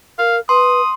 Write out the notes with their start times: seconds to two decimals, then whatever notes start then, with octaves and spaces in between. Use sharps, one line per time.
0.19 A#4 F5
0.49 B4 C6 D#6